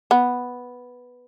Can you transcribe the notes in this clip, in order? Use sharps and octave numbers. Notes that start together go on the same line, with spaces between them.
B3